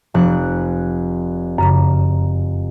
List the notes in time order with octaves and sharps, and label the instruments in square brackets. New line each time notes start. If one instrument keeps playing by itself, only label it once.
[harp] F1 F#6
[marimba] F#2 C#3 A#5